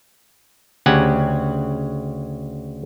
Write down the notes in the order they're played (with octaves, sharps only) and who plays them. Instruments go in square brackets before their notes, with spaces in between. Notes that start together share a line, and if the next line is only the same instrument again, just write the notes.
[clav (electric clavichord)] D2 C#3 G4 F#5 G#5